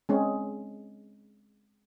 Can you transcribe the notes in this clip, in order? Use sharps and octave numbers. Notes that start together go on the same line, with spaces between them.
G#3 C4 C#4